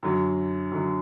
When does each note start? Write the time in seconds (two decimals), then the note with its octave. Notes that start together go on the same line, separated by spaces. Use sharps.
0.03 F#2 D3 F#3
0.72 F#2 D3 F#3